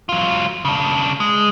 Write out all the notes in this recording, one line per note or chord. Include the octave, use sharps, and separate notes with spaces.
F#3 F4
C#3 D4
G#3